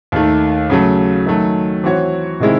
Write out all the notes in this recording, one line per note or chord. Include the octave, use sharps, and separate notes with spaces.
D#2 D#3 A3
C#3 F#3 A3
D#3 F#3 A3
E3 C4 F#4 C#5
C3 D#3 G#3 C4 E4